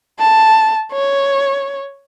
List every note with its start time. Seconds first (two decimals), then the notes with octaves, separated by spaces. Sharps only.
0.19 A5
0.92 C#5